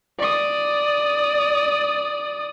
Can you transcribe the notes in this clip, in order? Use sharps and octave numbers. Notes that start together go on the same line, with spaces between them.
D5 D#6